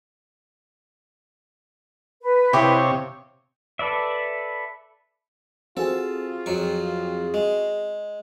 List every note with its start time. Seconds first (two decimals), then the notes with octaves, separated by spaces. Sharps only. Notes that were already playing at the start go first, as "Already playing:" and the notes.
2.22 B4
2.53 C3 E4 G4 C#5 D#5 F5
3.79 A4 B4 D5 E5
5.77 C4 F4 F#4 G#4 A4
6.46 F2 F#3 C#6
7.34 G#3